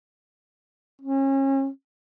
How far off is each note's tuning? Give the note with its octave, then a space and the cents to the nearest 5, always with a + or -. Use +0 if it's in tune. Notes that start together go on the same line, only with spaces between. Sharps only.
C#4 -35